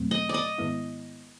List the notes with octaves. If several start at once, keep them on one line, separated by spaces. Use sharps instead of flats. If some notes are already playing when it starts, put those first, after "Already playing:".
Already playing: E2 B2 F#3 A3 C4
D#5
D5 D#5
G#2 D#3 G#3 B3 E4